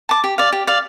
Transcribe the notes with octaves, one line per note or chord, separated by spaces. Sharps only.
A5 D6
G4
D5 F5
G4
D5 F5